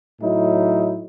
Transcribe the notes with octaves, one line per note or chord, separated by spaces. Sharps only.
A2 F#3 D#4 E4